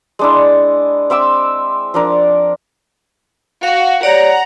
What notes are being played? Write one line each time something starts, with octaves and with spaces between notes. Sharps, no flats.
G#3 D4 E4
C4 E5 D6 E6
F3 D4 A#4
F#4 F5
G4 C#5 D5 F#5 A#5